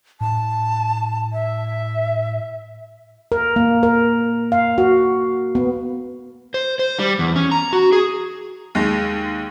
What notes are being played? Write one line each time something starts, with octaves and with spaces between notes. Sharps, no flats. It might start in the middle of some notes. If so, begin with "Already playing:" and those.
A2 A5
E5
A#4
A#3
A#4
F5
F#4
B3
C5
C5
G3
E2
C#4
A#5
F#4
G#4
D#2 G#3